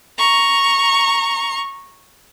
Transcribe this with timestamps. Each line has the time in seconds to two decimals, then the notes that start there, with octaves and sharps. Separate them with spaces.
0.18 A#5 C#6